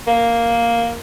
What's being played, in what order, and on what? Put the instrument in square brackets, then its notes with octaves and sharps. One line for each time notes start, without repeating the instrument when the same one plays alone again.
[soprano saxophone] A#3